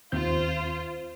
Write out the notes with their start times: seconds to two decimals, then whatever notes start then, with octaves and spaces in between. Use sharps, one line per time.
0.12 D#2 C4 F4 C5 G6